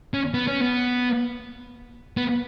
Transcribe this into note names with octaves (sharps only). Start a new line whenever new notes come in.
C#4
B3
C#4
B3
B3